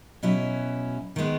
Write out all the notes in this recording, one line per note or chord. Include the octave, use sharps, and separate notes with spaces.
B2 F#3 C#4 E4
D#3 G#3 B3